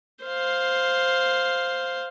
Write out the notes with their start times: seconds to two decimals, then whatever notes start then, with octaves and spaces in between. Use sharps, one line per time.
0.25 C5 F5